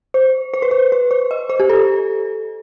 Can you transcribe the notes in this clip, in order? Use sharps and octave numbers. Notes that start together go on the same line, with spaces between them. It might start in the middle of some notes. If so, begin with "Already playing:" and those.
C5
C5
B4
C5
B4
C5
D#5
C5
G4
A4